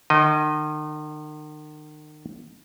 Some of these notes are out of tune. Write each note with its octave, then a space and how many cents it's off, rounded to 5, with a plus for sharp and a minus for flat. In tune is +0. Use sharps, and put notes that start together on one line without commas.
D#3 -40 D#5 +0